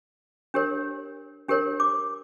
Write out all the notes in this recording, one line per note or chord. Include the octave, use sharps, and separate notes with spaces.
D4 G4 A#4 C#5
D4 G4 A#4 C#5
D6